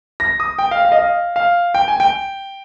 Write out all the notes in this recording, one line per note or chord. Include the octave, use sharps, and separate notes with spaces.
A#6
D#6
G5
F5
F5
D#5
F5
F5
G5
G#5
G5